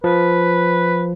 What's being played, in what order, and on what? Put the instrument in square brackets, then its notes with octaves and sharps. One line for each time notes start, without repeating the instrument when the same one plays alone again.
[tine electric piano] F3 [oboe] B4